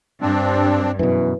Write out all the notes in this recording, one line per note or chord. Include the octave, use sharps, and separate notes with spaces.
G2 C4 D4
F#2 B2 E3